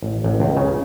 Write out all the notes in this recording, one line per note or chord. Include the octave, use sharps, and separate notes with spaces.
A1
A1
C#2
C#3